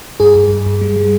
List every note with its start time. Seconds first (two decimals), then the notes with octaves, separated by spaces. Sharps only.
0.20 G2 G#4
0.36 G2
0.50 G2
0.66 G2
0.81 G3
0.96 G3